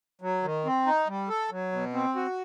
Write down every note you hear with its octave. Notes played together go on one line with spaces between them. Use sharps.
F#3
D#3
C4
D#4
G3
A4
F#3
B2
C4
F#4